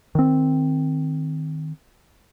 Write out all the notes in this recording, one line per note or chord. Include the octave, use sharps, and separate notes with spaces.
D#3 C4